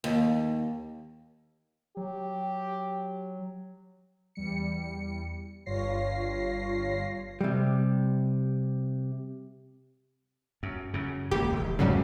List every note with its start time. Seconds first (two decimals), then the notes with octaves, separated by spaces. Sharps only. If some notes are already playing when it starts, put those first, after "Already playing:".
0.04 D#2
1.97 F#3 G4
4.35 E2 G3 C#7
5.66 G1 G2 F4 C#5 A#6 C7
7.41 C3 G3
10.63 F#2
10.94 F#2 C#3
11.31 D#1 C#2 A#3 G4
11.53 E1
11.79 F2 G#2 C#3 F#3 G3 A3